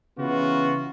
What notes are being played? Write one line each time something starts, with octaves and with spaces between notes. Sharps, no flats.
C#3 E3 B3 F4 F#4